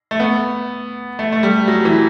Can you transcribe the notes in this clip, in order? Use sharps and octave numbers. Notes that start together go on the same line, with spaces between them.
A3
B3
A3
A3
G3
F#3
E3